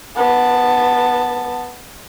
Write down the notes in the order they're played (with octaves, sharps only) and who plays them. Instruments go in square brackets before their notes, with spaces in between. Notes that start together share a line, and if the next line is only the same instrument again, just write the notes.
[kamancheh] B3 A5